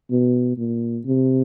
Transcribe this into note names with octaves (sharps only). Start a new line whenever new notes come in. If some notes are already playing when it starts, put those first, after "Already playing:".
B2
A#2
C3